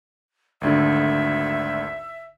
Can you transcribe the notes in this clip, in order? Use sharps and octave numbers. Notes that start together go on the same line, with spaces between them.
G#1 D2 D3 E5